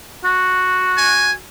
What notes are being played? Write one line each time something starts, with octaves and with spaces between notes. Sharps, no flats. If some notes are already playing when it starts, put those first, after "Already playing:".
F#4
G#5